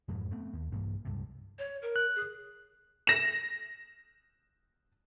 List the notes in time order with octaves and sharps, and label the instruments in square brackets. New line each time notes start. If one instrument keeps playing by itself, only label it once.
[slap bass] F2 G#2 B2 E3
A3 B3 C4
D#2
B1 G2 E3 A#3
C#2 G2 C3
[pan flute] C#5
A#4
[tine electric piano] F#6
[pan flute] G#4
[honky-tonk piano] A#6 E7